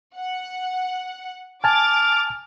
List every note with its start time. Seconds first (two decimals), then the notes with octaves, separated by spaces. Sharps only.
0.16 F#5
1.64 G#5 A5 D6 F6 A6